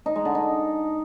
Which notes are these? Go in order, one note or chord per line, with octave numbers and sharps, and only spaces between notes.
D#4
G#3
D3
D#4